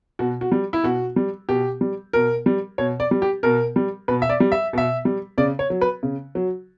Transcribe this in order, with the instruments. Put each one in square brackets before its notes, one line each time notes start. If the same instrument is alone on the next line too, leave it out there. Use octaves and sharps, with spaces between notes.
[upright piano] B2 F#4
F#4
G3
E4
B2 F#4
G3
B2 G4
G3
B2 A#4
G3
B2 C#5
D5
G3
G4
B2 A#4
G3
B2 B4
E5
D5
G3
E5
B2 E5
G3
C#3 D5
C#5
F#3
B4
C#3
F#3